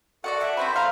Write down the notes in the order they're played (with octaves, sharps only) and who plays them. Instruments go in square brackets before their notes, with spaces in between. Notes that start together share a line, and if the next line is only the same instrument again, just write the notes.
[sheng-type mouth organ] F#4 A4 [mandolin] D5 D#5 F#5
[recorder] E5
[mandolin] C4 E4 B4 [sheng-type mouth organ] C5
[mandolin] F5 [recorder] A#5